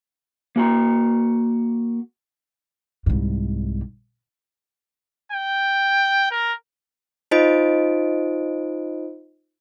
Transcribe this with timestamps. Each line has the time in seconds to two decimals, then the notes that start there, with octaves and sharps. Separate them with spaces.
0.56 A#3 F#4 A#5
3.06 C2 G#2
5.32 G5
6.31 A#4
7.31 D#4 F4 C5 D#5 D7